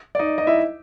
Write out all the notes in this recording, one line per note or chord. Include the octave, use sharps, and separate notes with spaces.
D5
D#4 D#5
D#4 D#5
E4 E5